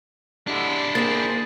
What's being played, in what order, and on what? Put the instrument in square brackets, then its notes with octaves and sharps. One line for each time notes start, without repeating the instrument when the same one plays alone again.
[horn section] D3 G3 G#3 [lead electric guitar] D4 E4
[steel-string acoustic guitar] A#3 C4 [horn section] G#4 C5 [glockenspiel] A6